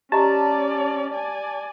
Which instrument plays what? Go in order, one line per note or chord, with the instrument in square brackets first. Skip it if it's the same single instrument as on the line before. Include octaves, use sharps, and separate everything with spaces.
[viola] C#4 D5 [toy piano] G4 D#5 A#5 [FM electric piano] A5
[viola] D5 G#5